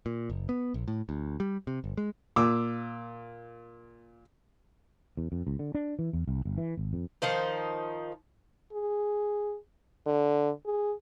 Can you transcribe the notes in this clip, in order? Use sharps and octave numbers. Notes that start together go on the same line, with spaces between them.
A#2
F#1
B3
A#1
A2
D2
G3
C3
G1
G#3
A#2 D6 E6
E2
F2
C#2
D3
D4
E3
E2
C2
G1
E3
G#1
F2
D#3 F3 D#4 C5
G#4
D3
G#4